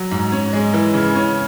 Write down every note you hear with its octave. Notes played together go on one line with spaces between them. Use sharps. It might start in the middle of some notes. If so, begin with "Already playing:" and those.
Already playing: F#3
G#2
C#4
G#3
E3
C#3
C#4